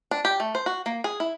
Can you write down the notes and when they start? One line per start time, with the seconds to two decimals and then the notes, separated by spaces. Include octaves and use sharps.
0.11 D4
0.25 G4
0.40 A3
0.55 C5
0.66 F#4
0.86 A#3
1.04 G#4
1.20 E4